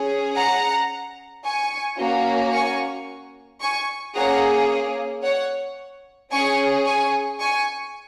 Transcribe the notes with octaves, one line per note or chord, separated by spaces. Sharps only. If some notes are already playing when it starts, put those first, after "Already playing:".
Already playing: C#4 G#4
F#5 A#5
G#5 C#6
A#3 C#4 F#4
G#5 C#6
G#5 C#6
A#3 C#4 G#4 F#5 A#5
C#5 F#5
C#4 G#4 G#5 C#6
G#5 C#6
G#5 C#6